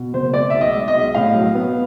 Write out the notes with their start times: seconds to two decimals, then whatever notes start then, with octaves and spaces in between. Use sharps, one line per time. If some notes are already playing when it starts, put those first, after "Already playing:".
Already playing: B2
0.13 F#1 C5
0.34 G#3 D5
0.50 B1 E5
0.61 D#5
0.74 G#3
0.88 D#5
0.95 B1
1.15 A2 F5
1.35 F#3
1.55 B3